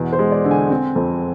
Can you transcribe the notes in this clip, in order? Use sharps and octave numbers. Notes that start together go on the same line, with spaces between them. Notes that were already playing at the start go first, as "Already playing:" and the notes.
Already playing: E2 B2
C5
G#3
D5
D3
G#5
C4
F2